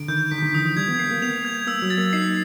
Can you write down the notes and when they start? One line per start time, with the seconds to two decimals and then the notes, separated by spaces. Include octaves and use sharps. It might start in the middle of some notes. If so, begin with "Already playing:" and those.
Already playing: D3 D7
0.08 D#3 G6
0.31 D3 B6
0.38 D#3
0.42 D3
0.54 E3 D#6
0.65 F3
0.77 G3 G#6
0.88 B3
0.99 A#3 C7
1.11 A#3
1.22 B3 F7
1.45 G#6
1.67 A#3 E6
1.82 F#3
1.90 A6
1.98 A#3
2.13 D#4 C7